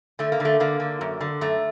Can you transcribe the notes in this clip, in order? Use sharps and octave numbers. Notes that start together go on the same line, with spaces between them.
D3 A3
A#3
D3
A3
D3 A#3
D3
F#2
D3
F#2 A3